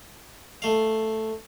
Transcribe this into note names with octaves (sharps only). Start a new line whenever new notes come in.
A3 F5